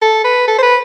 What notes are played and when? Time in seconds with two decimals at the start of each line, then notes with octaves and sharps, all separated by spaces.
0.02 A4
0.25 B4
0.48 A4
0.58 C5
0.63 B4